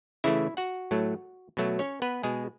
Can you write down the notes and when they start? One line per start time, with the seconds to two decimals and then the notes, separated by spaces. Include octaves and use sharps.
0.24 C#3 E3 A3 E4 E5
0.57 F#4 F#5
0.91 A2 F#3 A3
1.57 B2 F#3 A3
1.79 C#4 C#5
2.02 B3 B4
2.23 B2 G#3 G#4